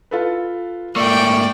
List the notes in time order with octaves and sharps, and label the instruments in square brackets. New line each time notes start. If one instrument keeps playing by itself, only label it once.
[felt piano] F4 A4 B4
[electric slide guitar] G#2 A3 A#3 [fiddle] D5 G5 [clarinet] C#6 [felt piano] E6